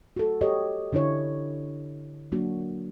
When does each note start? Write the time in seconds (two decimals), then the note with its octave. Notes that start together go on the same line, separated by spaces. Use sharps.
0.16 F#4 A4
0.41 G4 A4 C#5 D#5
0.93 D3 D4 E4 C#5
2.32 F#3 A#3 D4 F#4